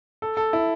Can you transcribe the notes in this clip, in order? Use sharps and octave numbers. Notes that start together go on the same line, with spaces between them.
A4
A4
E4